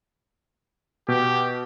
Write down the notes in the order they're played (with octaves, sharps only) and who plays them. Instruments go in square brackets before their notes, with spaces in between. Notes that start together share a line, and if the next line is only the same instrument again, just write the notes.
[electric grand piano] B2 [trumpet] G4